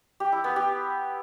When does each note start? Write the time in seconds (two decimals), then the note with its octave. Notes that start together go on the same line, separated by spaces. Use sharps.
0.20 G4
0.32 E4
0.44 B3
0.56 G4